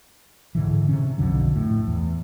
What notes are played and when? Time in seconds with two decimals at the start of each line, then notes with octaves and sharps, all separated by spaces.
0.55 G#2 D3 E3
0.89 C3 C#4
1.18 B1 F2 D3 F#3
1.56 A2
1.88 E2